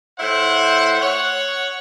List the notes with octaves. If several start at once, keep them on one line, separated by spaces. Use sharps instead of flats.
A2 E4 C5 E5 F#5
C#5 F#5